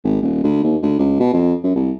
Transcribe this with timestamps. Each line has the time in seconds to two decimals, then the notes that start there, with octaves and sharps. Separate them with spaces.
0.04 G#1
0.22 D#1
0.43 D2
0.64 D#2
0.82 D2
0.99 C#2
1.20 B2
1.34 F2
1.63 F#2
1.76 C2